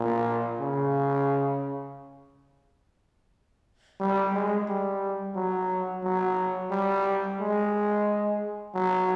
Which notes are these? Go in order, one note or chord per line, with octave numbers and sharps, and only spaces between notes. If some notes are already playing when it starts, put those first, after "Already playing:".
Already playing: A#2
C#3
G3
G#3
G3
F#3
F#3
G3
G#3
F#3